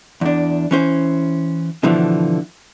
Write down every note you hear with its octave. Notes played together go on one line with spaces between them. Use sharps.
E2 D4
E3 C#4 C5
B2 D3 E3 F3